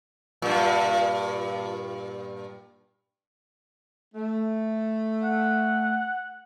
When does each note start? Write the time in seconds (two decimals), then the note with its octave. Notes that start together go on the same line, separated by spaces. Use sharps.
0.42 G2 A#2
4.15 A3
5.24 F#5